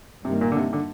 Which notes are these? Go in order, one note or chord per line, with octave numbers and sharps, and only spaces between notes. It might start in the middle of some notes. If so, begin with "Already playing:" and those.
G2 C3 D#3 G3 A#3
A#2
D3
C3
D3